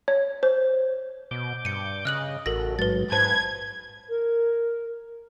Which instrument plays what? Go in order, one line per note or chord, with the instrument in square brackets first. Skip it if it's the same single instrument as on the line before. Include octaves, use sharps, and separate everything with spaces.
[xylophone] C#5
C5
[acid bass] B2 [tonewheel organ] D6 G6
[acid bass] G2 [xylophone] C#7 D#7
[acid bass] C#3 [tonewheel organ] D#5 [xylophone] F6 F#6 F#7
[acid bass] A1 [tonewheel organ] F#4 A4 [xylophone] A#4 A#6
[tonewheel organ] G#2 F#3 [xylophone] B4 A6
[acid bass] G#2 [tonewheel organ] B4 [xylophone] C5 A5 [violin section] G#6
[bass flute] A#4